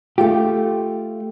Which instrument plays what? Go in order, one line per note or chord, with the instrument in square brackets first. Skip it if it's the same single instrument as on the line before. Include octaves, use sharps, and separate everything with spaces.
[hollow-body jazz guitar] A3 F4 G4